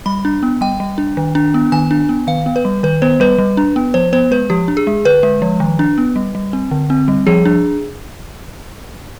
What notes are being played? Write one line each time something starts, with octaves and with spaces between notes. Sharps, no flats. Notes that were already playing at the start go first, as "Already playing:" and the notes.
G3 B5
D4
B3
G3 G5
G3
D4
D#3
D4
B3
D#3 G#5
D4
B3
D#3 F5
B3
B4
G3
D#3 B4
B3 C5
G3 B4
G3
D4
B3
F3 C5
B3 C5
G#3 B4
F3 G4
D4
G#4
G#3
D3 B4
G#3
F3
D#3
D4
B3
G3
G3
C4
D3
C4
G3
F3 G#4
D4